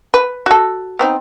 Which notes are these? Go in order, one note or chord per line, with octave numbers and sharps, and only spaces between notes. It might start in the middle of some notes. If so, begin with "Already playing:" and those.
B4
F#4 A4
B3 C4 D#4